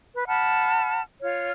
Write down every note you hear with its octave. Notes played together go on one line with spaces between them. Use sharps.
B4
F#5 A5 B5 F6
F4 C#5 F6